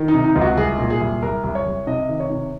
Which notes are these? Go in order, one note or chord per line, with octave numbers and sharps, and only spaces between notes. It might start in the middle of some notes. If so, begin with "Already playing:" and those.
Already playing: D#3
D#4
C3
D#4
C#2
F#4
C2 G#4
A#2
G#4
C2
C2 A#4
C2
C#5
C2
C3 D#5
D#3
C#5
C3